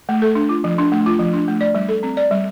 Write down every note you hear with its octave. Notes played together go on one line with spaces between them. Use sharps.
A3
A4
D4
F4
F3
D4
A3
F4
F3
D4
A3
D5
G3
A4
C4
D5
G3